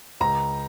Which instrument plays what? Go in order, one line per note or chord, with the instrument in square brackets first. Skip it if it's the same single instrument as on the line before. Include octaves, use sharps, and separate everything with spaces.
[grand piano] C#2 A#5